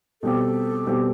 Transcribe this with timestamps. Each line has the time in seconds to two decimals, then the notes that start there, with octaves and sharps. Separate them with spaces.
0.22 B2 G3 C4 G4 A4
0.86 B2 G3 C4 G4